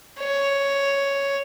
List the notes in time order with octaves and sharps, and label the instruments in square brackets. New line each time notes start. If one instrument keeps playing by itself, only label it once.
[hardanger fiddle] C#5